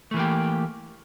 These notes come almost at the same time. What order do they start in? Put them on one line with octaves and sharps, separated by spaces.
A3 E3 A#3 G4